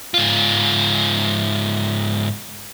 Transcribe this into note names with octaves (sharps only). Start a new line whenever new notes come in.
G#2 F4